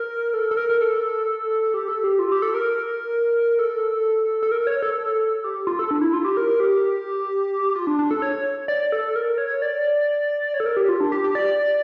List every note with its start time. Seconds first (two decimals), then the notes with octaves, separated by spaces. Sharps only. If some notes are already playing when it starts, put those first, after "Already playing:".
Already playing: A#4
0.34 A4
0.51 A4
0.57 A#4
0.70 A#4
0.81 A4
1.74 G4
1.88 A4
2.04 G4
2.19 F4
2.32 G4
2.42 A4
2.54 A#4
3.59 A4
4.43 A4
4.51 A#4
4.67 C#5
4.82 A4
5.44 G4
5.67 F4
5.79 A4
5.91 D4
6.01 E4
6.13 F4
6.25 G4
6.37 A#4
6.60 G4
7.76 F4
7.87 D4
7.99 D4
8.11 A4
8.22 C#5
8.68 D5
8.92 A4
9.16 A#4
9.38 C#5
9.62 D5
10.54 C#5
10.60 A4
10.66 A#4
10.77 G4
10.89 F4
11.00 D4
11.12 G4
11.24 G4
11.35 D5